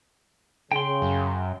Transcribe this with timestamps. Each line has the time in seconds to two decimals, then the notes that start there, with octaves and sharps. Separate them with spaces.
0.72 C#3 G5 C6
1.02 F#2